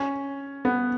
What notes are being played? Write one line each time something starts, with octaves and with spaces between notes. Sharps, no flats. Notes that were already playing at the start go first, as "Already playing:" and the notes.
Already playing: C#4
B3